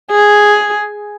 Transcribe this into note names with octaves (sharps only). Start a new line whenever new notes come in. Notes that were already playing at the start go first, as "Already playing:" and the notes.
G#4